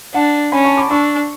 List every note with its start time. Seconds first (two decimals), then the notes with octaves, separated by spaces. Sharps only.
0.14 D4 F#5 A5
0.52 C#4 G#5 B5
0.65 A5 C#6
0.77 B5 D6
0.90 D4 C#6 E6